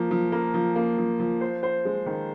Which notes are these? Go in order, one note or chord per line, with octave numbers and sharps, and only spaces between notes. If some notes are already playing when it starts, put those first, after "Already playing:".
Already playing: F3 A#3
F3
A#3
F3
A#3
F3
F3
C5
C5
G#3
D#3